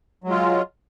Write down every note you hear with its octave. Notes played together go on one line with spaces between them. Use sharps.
F#3 G#3 F4